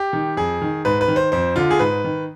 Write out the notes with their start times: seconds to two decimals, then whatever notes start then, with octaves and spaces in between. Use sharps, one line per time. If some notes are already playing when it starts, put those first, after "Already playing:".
Already playing: G4
0.13 D#3
0.37 F2 G#4
0.62 D#3
0.85 G#2 B4
1.01 B4
1.08 D#3
1.16 C5
1.32 F2 C5
1.56 D3 F4
1.71 G#4
1.79 G#2 B4
2.04 D#3